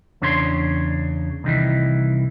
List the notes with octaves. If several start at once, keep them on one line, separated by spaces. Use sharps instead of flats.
E2 C#3 D4 C#5 C6
C2 D#3 E3